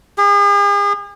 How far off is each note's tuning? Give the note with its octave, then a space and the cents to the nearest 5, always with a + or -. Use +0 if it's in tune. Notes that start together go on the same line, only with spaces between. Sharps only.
G#4 -40